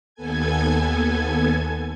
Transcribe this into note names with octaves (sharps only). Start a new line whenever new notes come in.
D#2 B3 A4 G#5 G#6